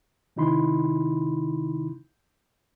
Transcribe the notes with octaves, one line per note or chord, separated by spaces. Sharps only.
C3 D#3 D#4 E4 B5 C6